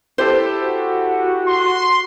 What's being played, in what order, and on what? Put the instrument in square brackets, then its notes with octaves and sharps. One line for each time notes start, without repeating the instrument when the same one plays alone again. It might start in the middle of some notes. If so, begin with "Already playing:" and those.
[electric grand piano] E4 G4 A4 [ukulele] C5
[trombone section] F#4
[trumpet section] C6